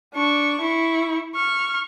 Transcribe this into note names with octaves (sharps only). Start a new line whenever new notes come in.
D4 C#6
E4 C#6
C#6 F6